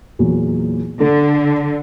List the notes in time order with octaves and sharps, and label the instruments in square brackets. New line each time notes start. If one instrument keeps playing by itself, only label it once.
[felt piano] E2 A#2 F#3
[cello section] D3 [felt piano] D4 A4